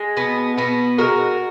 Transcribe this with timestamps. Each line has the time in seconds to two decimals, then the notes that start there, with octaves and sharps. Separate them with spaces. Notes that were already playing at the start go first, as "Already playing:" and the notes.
Already playing: G#3
0.17 B2 B3
0.58 B2 B3
0.98 G#3 F#4 A#4